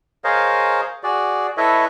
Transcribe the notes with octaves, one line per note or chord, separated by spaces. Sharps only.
G#4 A#4 C5 C#5 D#5 F5
F#4 G#4 D5
E4 A4 B4 C#5 D#5 E5